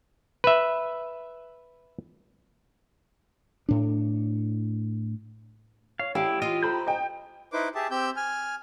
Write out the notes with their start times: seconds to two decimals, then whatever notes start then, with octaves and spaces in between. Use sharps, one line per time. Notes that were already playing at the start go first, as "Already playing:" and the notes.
0.44 B4 E5
3.69 A2 D4
5.99 C#5 F5
6.15 A1 E4 G4 F5
6.42 F4 D#5
6.63 A4 C5 A#5 B5 G6
6.87 D#5 G5
7.52 D#4 E4 B4 C5 D6
7.75 G4 G#4 E5 A5
7.91 C4 G4 E6 G6
8.16 G#5 F6